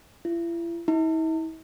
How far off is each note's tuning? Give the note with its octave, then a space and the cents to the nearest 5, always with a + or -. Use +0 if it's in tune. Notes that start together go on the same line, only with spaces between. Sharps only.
E4 +40
E4 -45